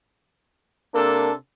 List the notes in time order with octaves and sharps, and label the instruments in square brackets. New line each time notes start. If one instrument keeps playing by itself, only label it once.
[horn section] C3 D4 A4 [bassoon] A#3